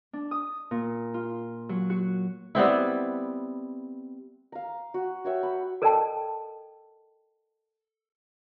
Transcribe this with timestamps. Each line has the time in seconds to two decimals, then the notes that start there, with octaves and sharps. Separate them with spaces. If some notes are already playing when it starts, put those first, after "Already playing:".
0.13 D4
0.31 D#6
0.71 A#2
1.14 F4
1.69 F#3
1.90 F#4
2.55 G3 B3 C4 E4
4.52 F5 A#5
4.94 F#4
5.25 F#4 C#5 E5 G5
5.43 B5
5.82 A4 A#4 D5 D#5 G5 A5